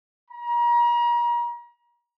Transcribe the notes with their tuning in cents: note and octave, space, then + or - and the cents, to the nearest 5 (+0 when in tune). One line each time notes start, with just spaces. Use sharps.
A#5 +35